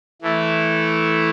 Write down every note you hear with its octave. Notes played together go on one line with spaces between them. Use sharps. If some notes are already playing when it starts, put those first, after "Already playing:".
E3 A3 E4 A4